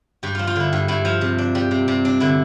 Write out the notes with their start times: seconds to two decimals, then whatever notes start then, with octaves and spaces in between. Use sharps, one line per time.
0.23 G2 G4
0.35 F3 F4
0.47 F4
0.56 D3 E4
0.73 G2
0.88 G2 E4
1.05 F3 F4
1.21 C3
1.38 D4
1.55 G3
1.71 C3
1.88 C3
2.05 D4
2.20 D3 E4